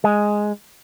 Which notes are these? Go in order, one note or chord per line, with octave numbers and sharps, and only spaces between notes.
G#3